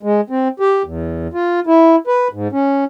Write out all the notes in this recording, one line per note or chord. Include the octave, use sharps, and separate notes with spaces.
G#3
C4
G4
E2
F4
E4
B4
G#2
C#4